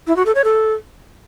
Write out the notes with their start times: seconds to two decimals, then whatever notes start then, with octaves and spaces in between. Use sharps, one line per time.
0.07 E4
0.16 F#4
0.26 A4
0.35 C#5
0.44 A4